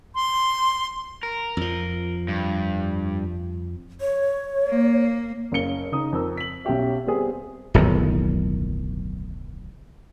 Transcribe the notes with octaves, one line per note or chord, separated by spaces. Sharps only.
C6
A#4
F2 F3
G2
C#5
A#3
F#1 C#4 F5 C#7 G7
C#3 D#4 D#6
F2 A#4 E6
B6 F#7
B1 C#4 F#4 G4 E5
G3 B3 C4 G#4
D1 B1 F2 D#3